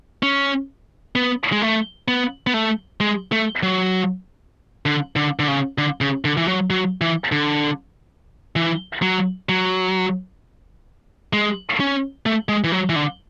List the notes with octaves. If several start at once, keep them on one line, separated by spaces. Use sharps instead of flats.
C#4
B3
G#3
A3
B3
B3
A3
G#3
A3
F#3
D3
D3
D3
C#3
D3
C#3
D3
E3
F#3
F#3
E3
D3
E3
F#3
F#3
G#3
C#4
A3
G#3
E3
F#3
E3
D3